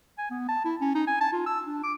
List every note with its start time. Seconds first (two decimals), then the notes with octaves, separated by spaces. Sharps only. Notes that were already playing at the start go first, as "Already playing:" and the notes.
0.18 G#5
0.31 B3
0.48 A5
0.65 E4
0.81 C#4
0.95 D#4
1.07 G#5
1.21 A5
1.33 F4
1.46 E6
1.67 D4
1.84 D6